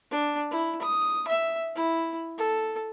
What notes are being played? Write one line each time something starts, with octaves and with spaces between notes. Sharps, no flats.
D4
E4
D#6
E5
E4
A4